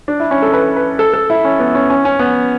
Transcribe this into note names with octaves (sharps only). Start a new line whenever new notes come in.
D4
E4
C#4
A4
B4
B4
A4
A4
E4
C#4
B3
C#4
C#4
C#4
B3